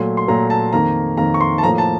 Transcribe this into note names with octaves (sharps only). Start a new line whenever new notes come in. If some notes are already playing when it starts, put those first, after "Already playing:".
Already playing: A#2 F#3 A3 C6
C6
A#2 F#3 A3 A#5
A5
F2 D#3 A#3 A#5
F2 D#3 A#3 A#5
C#6
C6
A5
A2 F3 A#3 A#5
A5